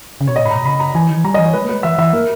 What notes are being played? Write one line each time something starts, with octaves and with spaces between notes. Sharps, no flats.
C#3
B2 C#5
A#2 D#5
G#2 B5
B2 A#5
C#3 B5
A#5
E3 G#5
D#3
E3
G3 A#5
D#5
E3
C#5
G#3 B4
A#3
G#3 B4
E3 E5
E3 E5
A#3 A#4